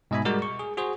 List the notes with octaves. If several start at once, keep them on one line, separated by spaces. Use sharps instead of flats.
G#2 B2 D#5 E5 G#5 B5
G3 G#3 F#4 A#4 D5
C#6
G#4
F#4 G#4 C5